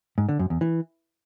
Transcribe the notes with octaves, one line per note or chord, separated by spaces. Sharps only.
G#2
D3
F#2
E2
E3